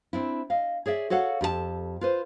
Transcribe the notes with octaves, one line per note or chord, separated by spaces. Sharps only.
C4 D4 E4
D#5 F5
G#4 C#5 D5 E5
F#4 A4 C#5 F5 F#5
F2 G4 G#4 A5
F4 B4 C5